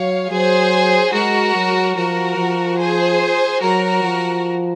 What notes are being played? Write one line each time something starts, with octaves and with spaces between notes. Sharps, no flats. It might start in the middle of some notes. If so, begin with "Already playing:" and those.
Already playing: F#3 C#5 F5
F#3 G#4 C5
G#3 F#4 A#4
F#3
F3 F#4 A#4
F3
G#4 C5
F#3 F#4 A#4
F3